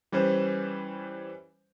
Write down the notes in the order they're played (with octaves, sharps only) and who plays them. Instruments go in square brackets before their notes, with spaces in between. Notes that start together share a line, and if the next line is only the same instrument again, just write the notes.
[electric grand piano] E3 G3 C#4 B4 C5